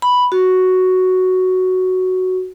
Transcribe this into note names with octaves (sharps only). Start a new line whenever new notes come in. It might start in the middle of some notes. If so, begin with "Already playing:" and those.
B5
F#4